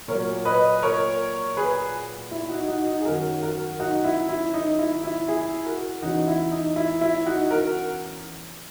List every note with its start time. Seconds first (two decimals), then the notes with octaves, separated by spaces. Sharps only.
0.08 A#2 F#3 A#4 C#5
0.45 B4 D#5
0.82 A#4 C#5
1.57 G#4 B4
2.31 E4
2.49 D#4 F#4
2.68 D#4 F#4
2.87 D#4
3.01 G#4
3.05 F#2 D#3 F#3 F#4 A#4
3.42 F#4 A#4
3.79 D#4 F#4
4.04 E4
4.29 E4
4.54 D#4
4.79 E4
5.03 E4
5.28 E4 G#4
5.65 F#4 A#4
6.02 E2 C#3 E3 D#4 F#4
6.28 E4
6.51 D#4
6.76 E4
7.01 E4
7.26 D#4 F#4
7.51 F#4 A#4